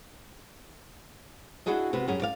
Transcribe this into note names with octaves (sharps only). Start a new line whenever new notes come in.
D4 E4 F#4 G#4 D#5
C3 B3 F#4
F#2 G3 C#4 G#4
D5 F5